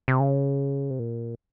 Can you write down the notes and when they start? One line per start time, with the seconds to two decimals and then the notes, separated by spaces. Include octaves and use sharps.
0.08 C3
0.20 C#3
0.90 C3
0.99 A#2